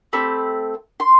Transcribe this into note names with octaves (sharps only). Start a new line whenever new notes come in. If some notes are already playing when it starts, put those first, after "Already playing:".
A3 C4 G4 B5
C6